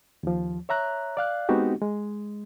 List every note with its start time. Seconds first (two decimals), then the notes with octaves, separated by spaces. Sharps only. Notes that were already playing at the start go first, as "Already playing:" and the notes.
0.23 D#2 F3
0.69 C#5 E5 A#5 F#6
1.17 D5 F5 F#6
1.49 G#3 B3 C4 D#4 F#4 G4
1.82 G#3